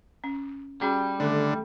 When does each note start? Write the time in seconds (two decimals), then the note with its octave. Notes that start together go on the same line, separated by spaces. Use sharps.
0.24 C#4
0.81 G3 C#4 F#4 G#4
1.20 D3 D#3 A3 A4